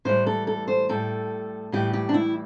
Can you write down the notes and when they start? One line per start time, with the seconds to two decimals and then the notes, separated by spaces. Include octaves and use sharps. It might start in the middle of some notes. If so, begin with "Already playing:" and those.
0.05 A2 E3 G3 C5
0.26 A4
0.47 A4
0.68 C5
0.89 A2 G3 A4
1.72 A2 E3 G3 G4
1.93 G4
2.09 D4
2.14 E4